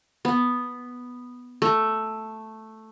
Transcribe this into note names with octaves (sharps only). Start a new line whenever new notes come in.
B3
A3